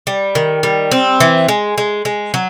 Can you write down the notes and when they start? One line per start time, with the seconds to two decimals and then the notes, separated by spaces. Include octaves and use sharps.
0.07 G3
0.35 D#3
0.63 G3
0.91 C4
1.20 E3
1.48 G#3
1.78 G#3
2.05 G#3
2.34 F#3